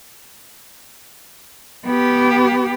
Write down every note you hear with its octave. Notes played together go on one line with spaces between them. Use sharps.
B3 G4